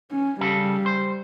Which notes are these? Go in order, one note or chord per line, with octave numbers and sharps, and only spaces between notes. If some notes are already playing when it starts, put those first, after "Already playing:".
C#4
C#3 G3 A4
C5